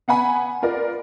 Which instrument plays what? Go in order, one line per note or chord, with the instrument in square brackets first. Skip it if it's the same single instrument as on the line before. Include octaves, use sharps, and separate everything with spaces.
[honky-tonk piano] B3 F#5 G#5 B5
F4 A#4 B4 D5